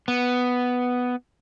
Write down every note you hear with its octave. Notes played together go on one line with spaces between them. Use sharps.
B3